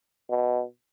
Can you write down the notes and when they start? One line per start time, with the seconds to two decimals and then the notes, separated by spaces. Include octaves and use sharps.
0.30 B2